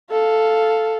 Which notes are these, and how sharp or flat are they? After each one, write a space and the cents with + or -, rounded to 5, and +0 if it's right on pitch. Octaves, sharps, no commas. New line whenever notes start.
A4 +0 F5 +0